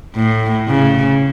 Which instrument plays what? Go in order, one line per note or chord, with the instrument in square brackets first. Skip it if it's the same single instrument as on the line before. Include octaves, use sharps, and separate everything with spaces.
[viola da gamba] A2
C#3